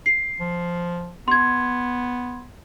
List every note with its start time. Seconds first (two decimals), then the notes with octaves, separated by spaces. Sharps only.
0.06 C7
0.40 F3
1.28 B3 C6 G#6